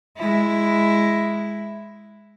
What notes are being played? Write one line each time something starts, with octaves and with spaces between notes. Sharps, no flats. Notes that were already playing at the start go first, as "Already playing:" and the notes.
G#3 E4